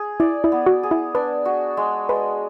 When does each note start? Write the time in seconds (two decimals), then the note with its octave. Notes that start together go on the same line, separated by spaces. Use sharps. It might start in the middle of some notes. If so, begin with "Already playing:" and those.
Already playing: G#4
0.20 E4 D5
0.44 E4
0.52 B3
0.66 F#4
0.83 G#4
0.91 E4
1.15 D4 B4
1.45 F#4
1.77 G#3
2.09 G#3 B4